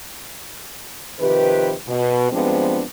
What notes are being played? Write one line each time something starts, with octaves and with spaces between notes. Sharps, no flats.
C3 D#3 F3 G4 B4
B2
G2 F3 G#3 B3 C4 D4